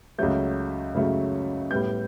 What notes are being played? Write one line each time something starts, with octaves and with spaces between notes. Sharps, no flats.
C#2 C#3 F#3 A3 G6
C#2 C#3 F#3 A3
A2 G3 B3 G6